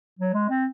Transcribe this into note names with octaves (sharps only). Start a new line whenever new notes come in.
F#3
G#3
C4